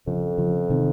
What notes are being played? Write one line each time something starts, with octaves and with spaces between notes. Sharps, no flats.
F2 C#3 F3
C#3 F3
C3 D#3